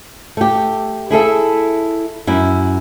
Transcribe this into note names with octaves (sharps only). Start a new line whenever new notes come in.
A3 G4
E4 G#4 A4 E5
F#2 E4